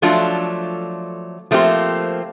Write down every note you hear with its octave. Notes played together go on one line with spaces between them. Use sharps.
F3 F#3 A3 D4 F4
F3 A3 A#3 C4 G4